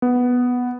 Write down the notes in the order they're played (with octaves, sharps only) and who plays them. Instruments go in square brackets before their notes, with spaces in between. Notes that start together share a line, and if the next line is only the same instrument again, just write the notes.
[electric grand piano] B3